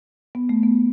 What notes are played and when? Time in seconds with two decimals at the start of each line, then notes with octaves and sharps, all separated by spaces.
0.35 B3
0.49 A3
0.63 B3